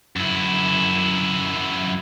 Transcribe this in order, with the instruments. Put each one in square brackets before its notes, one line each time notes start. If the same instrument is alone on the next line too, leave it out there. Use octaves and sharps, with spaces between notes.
[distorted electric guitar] F#2 E4